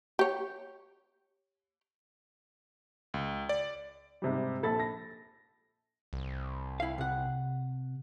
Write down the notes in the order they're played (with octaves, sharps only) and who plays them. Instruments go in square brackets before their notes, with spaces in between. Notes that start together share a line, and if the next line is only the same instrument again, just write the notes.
[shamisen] G4 C#5
[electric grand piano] C#2
D5
[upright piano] G#2 C3 G3
A#1 A4 B5 A6
A#6
[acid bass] C2
[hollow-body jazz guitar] E4 F5
C3 F#5